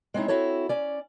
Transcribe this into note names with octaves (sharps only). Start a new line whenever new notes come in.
G#3 C4 C#4 D#4 E4
C4 E4 F#4 A4 C#5
C#4 D5